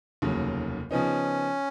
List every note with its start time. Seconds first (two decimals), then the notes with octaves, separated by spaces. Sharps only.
0.22 F1 D#2 C#3 F#3
0.91 C#3 F3 B3 C#4 D#4